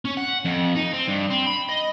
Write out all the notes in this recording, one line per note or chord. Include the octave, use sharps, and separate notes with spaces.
C#4
F#5
F2
D#4
C4
G2
C4
B5
D#5